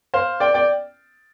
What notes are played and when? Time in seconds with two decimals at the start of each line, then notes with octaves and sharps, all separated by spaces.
0.14 C5 F5
0.40 D5 G5
0.54 D5 G5